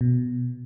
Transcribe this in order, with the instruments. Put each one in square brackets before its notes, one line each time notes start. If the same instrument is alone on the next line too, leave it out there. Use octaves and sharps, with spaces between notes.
[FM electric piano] B2